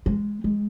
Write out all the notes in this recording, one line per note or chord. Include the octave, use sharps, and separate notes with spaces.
G#3
G#3